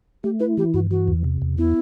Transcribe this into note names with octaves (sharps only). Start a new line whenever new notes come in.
A3 G4
E4 B4
E3 G4
G2 F#4
E3 F#4
E2
C3
E2
B3 E4